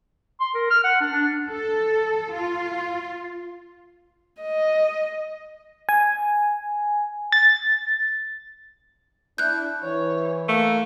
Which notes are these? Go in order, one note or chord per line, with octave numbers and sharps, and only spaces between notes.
C6
A#4
F6
F#5
D4
D4
A4
F4
D#5
G#5
A6
D4 E4 F#6 G6
E3 C#5
A3 A#3